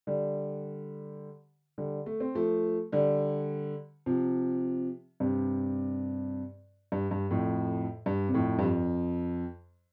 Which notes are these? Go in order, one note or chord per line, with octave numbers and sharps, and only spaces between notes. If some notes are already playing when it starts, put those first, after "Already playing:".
D3 G3
D3 G3
A3
C4
F3 A3
D3 G3
C3 F3
G2 C3
G2
G2
F2 A2
G2
C3
F2 A2
G2
F2